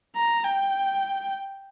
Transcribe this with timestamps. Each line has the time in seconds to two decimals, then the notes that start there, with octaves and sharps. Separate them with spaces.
0.16 A#5
0.45 G5